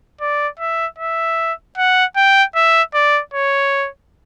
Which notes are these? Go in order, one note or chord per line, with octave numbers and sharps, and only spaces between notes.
D5
E5
E5
F#5
G5
E5
D5
C#5